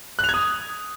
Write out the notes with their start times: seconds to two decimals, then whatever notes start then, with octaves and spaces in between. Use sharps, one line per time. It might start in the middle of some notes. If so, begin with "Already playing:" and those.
0.19 F#6
0.24 F7
0.29 G#6
0.34 D#6